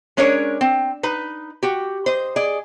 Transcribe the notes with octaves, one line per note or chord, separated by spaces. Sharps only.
G#3 C#4 D4 A#4 C#5
C4
D#4 B4
F#4 G4
C5 D#5
G#4 D5 D#5